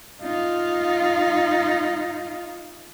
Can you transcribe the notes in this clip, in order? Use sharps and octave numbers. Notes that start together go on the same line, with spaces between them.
D#4 F4